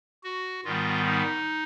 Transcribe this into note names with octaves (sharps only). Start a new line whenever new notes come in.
F#4
G#2 D#3 G3 B3 F4
D#4